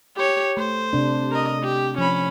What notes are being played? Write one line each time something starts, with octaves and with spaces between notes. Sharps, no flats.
G4 C#5
A3 C5
C3 D4
A#4 D#5
G4
F3 C#4 B5